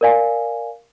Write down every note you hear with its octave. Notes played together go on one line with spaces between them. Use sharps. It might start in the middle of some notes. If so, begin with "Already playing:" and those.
A#4 D5 F5 G#5